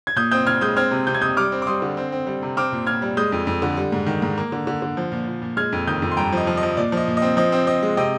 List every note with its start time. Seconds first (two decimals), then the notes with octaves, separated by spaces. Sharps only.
0.07 G#6
0.16 A#2 D#6 G6
0.31 C4 D#6 G6
0.47 A#2 F6 G#6
0.61 G#3 D#6 G6
0.77 C4 F6 G#6
0.91 C3
1.07 C3 G6
1.15 G#6
1.21 C3 D#6 G6
1.37 G3 D6 F6
1.52 C4
1.62 D6
1.67 G3 C6 D#6
1.82 D3
1.97 C4
2.12 C4
2.27 G3
2.42 C3
2.57 C4 D6 F6
2.72 A#2
2.87 A#2 F6 G#6
3.02 G3
3.17 G#3 D#6 G6
3.32 F2
3.47 F2
3.62 D3
3.77 G3
3.92 G#2
4.06 D#3
4.22 G#2
4.38 A#3
4.52 D3
4.67 D3
4.82 D3
4.97 F3
5.12 A#2
5.27 A#2
5.42 A#2
5.57 G#3 F6 G#6
5.72 F2
5.87 D#3 D#6 G6
6.02 F2
6.11 C6
6.17 G2 G5 A#5
6.32 F3 D#5
6.47 F3
6.57 D#5
6.63 F3
6.77 A#2 D5
6.92 F3 D#5
7.07 A#2
7.17 D#5
7.22 C4
7.37 F3 D#5
7.52 C4
7.67 C4 D#5
7.83 G#3
7.97 C3 D#5 G5